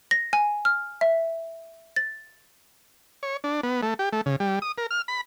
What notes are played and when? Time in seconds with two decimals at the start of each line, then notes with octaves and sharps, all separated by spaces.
0.11 A#6
0.33 G#5
0.65 F6
1.01 E5
1.96 A6
3.23 C#5
3.44 D4
3.63 B3
3.83 A3
3.99 G4
4.13 A3
4.26 C#3
4.40 G3
4.62 D#6
4.78 A#4
4.91 F6
5.08 B5